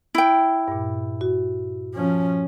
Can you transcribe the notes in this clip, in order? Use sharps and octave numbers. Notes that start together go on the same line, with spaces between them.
E4 G5
G2 A#2
F#4
F3 C#4